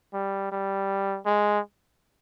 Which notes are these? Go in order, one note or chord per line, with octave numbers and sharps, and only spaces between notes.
G3
G3
G#3